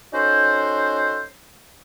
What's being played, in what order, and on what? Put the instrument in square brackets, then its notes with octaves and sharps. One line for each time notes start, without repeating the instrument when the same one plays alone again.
[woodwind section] C#4 D#4 F#4 A4 C5